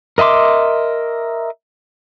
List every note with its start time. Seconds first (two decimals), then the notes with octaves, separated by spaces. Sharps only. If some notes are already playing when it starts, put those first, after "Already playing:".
0.18 A#4 D#5 E5 C6 D6